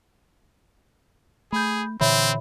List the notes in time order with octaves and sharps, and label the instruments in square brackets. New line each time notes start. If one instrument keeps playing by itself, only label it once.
[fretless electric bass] A3 [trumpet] G#4 [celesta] B5 G6
[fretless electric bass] A#2 D3 E3 [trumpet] C4 [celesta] C#5 E5 B5